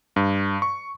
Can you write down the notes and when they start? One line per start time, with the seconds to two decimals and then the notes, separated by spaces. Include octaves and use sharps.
0.16 G2
0.62 C#6